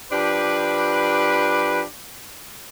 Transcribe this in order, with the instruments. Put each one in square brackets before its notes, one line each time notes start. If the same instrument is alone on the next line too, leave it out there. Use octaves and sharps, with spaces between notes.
[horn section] F3 D4 G4 B4